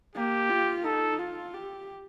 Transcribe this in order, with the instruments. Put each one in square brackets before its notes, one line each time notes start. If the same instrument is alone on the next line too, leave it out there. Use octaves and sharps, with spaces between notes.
[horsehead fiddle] A#3 [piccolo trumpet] G4
[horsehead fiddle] F4
[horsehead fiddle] D#4 [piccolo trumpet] A4
[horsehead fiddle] F4
G4